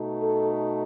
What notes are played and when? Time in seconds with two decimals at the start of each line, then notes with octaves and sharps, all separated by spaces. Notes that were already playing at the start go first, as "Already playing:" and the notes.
Already playing: B2 A3 D#4
0.22 A4